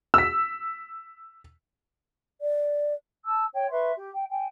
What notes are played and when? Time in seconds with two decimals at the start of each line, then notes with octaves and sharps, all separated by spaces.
0.14 E6 B6
2.41 D5
3.24 A5 E6
3.53 C#5 G5
3.70 B4 E5 C6 C#6
3.96 G4
4.13 G5
4.30 G5 G#5